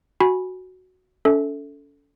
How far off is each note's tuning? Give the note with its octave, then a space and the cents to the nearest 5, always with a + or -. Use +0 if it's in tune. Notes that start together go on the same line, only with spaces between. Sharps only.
F#4 +0 G#5 +0 B5 -15
C#4 +45 A4 +0 E5 -15